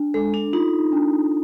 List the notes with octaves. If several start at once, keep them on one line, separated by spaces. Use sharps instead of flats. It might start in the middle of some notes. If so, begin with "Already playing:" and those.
Already playing: D4
G#3 A4
D4
D#4 F4
D4